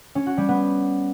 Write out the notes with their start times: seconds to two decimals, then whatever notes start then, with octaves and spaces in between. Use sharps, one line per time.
0.15 C#4
0.26 F#4
0.37 G3
0.49 B3